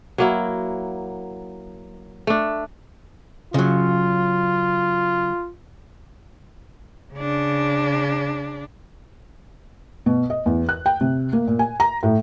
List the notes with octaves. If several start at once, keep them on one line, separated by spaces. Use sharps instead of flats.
F#3 A#3 E4
A3 D4
C#3 F#3 F4
C#3 D4
B2
D#5
E2
F#6
G5
C3
A#3
A#2
G#5
A#5
A2